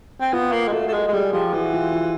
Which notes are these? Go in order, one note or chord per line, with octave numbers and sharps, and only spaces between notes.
C4
B3 F4
A#3
G#3
A3 F#4
A3
G#3
G#3
G3 G#4
F3 G4
E3 F#4
F4
F4